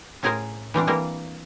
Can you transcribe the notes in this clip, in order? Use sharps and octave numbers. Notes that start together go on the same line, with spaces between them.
A2 C#4 G#4 A#4 C5 G#5
E3 G3 C4 D4
E3 G3 A#3 C4 A#4